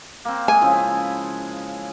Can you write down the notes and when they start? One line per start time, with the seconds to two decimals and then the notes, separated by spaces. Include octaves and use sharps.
0.25 A#3 C4
0.48 G#3 G#4 G#5
0.61 C#3 F3 E4